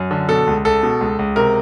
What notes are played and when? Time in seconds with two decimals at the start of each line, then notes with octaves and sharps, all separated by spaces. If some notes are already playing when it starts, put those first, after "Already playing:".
Already playing: F#2
0.11 D3
0.29 B2 A4
0.47 C#2
0.65 C#2 A4
0.83 B2
1.01 C#2
1.19 C#2
1.36 C3 A#4